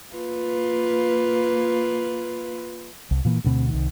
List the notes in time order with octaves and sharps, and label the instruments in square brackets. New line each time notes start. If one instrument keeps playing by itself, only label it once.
[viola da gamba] A#3 F4 B4
[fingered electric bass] C2
A#2 E3 A#3
D2 B2 B3 C4
C2 D#3